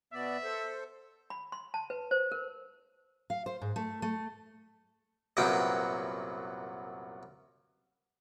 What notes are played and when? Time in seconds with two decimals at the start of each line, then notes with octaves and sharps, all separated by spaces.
0.13 B2 B3 D5 E5
0.44 A4 C5
1.30 B5
1.52 C6
1.74 A5
1.90 B4
2.11 C5
2.32 A#4
3.30 F5
3.46 C5
3.61 G#2
3.76 A3
4.02 A3
5.37 C2 F#2 A#2 F#3 B3 G5